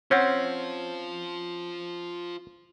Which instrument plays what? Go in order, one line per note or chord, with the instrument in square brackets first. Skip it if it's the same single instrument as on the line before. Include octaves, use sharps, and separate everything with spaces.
[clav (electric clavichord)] C4 C#4 [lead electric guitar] F4 C5 [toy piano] C#5 F#5